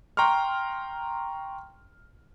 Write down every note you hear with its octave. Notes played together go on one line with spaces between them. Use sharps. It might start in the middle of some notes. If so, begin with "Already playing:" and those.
G5 A#5 C6 C#6 F6